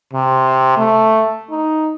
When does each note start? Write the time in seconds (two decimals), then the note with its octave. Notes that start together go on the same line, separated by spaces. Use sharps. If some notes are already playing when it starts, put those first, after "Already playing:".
0.14 C3
0.78 A3
1.51 D#4